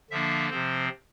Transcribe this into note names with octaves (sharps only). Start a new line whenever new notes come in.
D3 F3 A#3 D4 E5
C3 F3 C4 C5